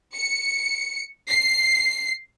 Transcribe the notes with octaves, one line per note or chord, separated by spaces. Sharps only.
C#7
C7